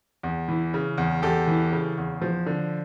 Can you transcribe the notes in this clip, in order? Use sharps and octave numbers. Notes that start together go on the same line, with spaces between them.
E2
E3
C#3
E2
E2 G4 A4
E3
C#3
E2
F3
D3